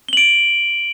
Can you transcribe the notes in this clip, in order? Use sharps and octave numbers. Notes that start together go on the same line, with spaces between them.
D7 F#7 G7